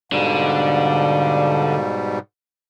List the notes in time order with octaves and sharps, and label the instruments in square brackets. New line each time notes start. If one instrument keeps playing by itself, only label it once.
[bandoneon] G#2 B2 G3 [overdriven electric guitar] D3 [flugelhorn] F5